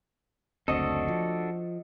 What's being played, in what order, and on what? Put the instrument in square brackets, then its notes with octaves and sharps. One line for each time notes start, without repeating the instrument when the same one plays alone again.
[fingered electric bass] F#1 D2 C4 [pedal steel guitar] D4 F#4 A4 [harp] D#5
[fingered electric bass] F3